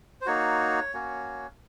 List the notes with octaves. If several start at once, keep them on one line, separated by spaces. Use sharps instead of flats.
C5
A#3 D#4 F#4 C#5
A#3 C#4 F#4